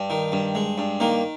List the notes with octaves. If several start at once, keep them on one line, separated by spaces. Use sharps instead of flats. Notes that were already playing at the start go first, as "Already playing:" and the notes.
Already playing: G2
D#3
G2
G#3
G2
D#3 A#3